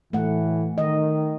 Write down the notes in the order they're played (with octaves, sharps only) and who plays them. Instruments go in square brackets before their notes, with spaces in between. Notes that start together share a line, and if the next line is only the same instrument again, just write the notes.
[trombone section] A2 E3 [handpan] A3 F#5
[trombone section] D#3 [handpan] D#5